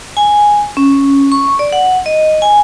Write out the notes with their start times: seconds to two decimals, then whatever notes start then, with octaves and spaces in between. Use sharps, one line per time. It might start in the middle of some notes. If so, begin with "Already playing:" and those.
0.17 G#5
0.77 C#4
1.32 C#6
1.59 D5
1.73 F#5
2.06 D#5
2.42 G#5